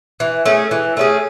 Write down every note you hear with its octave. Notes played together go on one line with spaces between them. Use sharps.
E3
A3 C#4 G#4
E3
A3 C#4 G#4